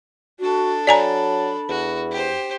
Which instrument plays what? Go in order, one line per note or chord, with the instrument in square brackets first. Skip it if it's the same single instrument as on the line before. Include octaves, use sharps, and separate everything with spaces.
[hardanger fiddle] D4 A4 [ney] F#4
[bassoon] F#3 [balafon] D5 G#5 A#5 [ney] B5
[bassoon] E2 [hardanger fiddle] F#4
[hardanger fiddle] G4 C5